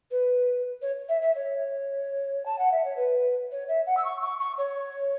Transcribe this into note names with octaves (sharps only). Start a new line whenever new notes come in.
B4
C#5
E5
E5
C#5
A5
F#5
E5
C#5
B4
C#5
E5
F#5
E6
C#6
C#6
C#6
C#5